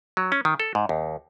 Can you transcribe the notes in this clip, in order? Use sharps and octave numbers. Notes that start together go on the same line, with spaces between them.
F#3
C#4
D#3
A4
G#2
D#2